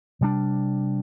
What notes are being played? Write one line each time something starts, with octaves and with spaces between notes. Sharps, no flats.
C3 G3 D4